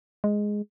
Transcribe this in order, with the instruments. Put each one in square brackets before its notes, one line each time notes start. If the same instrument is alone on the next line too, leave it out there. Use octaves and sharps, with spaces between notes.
[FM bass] G#3